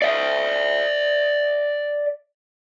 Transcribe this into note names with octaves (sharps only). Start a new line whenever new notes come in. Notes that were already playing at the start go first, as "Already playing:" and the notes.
D5 E5